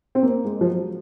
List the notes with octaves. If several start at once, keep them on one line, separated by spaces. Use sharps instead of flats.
C4
A#3
G#3
F3
F#3